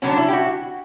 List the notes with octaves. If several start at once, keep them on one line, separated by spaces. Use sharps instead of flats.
D3 F#3 B3 C#4
D4
E4
G4
F#4